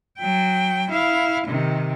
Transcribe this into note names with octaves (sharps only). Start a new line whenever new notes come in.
F#3 G5
E4 F5
C3 D#3